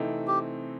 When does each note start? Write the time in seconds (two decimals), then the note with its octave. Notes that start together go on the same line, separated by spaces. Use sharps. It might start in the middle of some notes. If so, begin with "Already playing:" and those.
Already playing: C3 E3 A3 C4 D#4
0.27 G4